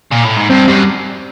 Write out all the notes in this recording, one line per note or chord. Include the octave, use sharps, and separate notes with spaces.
A#2
A2
G#2
G2 C4
F#2 G3